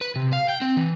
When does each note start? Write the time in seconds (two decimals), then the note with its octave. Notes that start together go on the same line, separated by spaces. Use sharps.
0.01 B4
0.16 C3
0.33 F5
0.49 G5
0.61 C4
0.77 E3